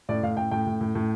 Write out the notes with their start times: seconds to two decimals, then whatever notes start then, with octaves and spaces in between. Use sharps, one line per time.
0.09 A2 D5
0.23 A2 F5
0.37 A2 G5
0.51 A2 G5
0.66 A2
0.81 A2
0.95 A2